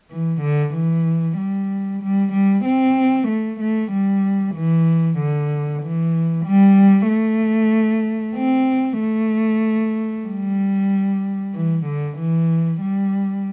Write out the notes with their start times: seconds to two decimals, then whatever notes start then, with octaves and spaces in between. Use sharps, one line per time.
0.11 E3
0.43 D3
0.75 E3
1.39 G3
2.02 G3
2.33 G3
2.66 C4
3.29 A3
3.61 A3
3.93 G3
4.56 E3
5.19 D3
5.83 E3
6.47 G3
7.10 A3
8.37 C4
9.01 A3
10.27 G3
11.55 E3
11.86 D3
12.19 E3
12.82 G3